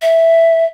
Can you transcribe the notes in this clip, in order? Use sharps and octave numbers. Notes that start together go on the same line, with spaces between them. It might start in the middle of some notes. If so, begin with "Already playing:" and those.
E5